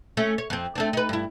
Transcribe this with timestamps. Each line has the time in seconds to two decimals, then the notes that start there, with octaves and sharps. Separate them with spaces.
0.17 A3 C#4
0.38 C#5
0.50 F2 C4
0.76 A3 C4 D4
0.93 D#4 B4
1.09 G2 E4